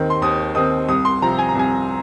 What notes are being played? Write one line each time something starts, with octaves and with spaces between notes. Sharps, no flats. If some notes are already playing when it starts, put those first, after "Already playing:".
Already playing: D#2 D#3 C4
C6
D#2 D#6
D#3 C4 D#6
C2 D#6
C6
C3 F3 C4 A#5
G#5
A#5
C2 G#5